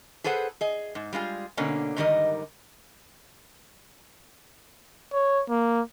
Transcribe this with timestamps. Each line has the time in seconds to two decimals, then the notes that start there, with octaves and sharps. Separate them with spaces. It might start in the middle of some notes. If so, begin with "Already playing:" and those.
0.24 G#4 A4 B4 C5 F#5
0.61 G#4 D#5
0.95 G#2
1.13 G3 G#3 F4 G#4
1.57 B2 D3 A#3 C#4
1.96 G#2 D3 D#3 G3 A#4 D#5
5.13 C#5
5.49 A#3